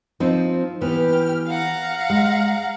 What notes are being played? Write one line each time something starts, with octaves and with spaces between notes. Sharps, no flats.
F3 C4 D#4
E3 B3 G4 F6
F5 F#5 A#5
G#3